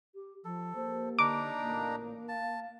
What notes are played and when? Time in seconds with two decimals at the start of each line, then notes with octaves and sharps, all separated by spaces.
0.15 G4
0.45 F3 A4
0.75 A#3 G4 C5
1.19 D3 D4 D#4 A#5 D6
1.63 A1 A#2 A#3
2.28 F5 A5